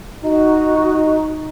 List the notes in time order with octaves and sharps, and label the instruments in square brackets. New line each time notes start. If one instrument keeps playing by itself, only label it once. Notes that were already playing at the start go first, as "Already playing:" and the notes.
[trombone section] D#4 [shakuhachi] F#4